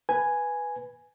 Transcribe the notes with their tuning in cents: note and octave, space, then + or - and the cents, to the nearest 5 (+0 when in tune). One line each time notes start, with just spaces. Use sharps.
B4 +0 G#5 +0